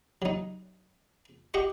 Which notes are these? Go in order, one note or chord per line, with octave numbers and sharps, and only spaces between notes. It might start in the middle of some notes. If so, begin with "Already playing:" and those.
F#3 D#4
F#4 G4 D#5 C#6